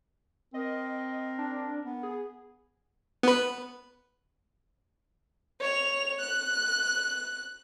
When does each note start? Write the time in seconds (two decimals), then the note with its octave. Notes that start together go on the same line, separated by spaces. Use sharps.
0.54 C4 A#4 D#5
1.38 D4
1.85 B3
2.03 G#4
3.23 B3 B4
5.60 C#5 F7
6.19 F#6